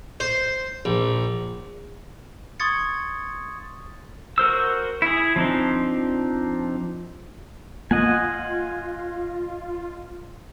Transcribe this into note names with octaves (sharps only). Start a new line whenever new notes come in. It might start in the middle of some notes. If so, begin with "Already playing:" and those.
C5
A#1
C6 C#6 D#6 G#6 A6 C#7
F#4 A#4 C5 E6
E4 G#4
F3 C4 D4 D#4
A#3 F4 D#5 F#5 G#5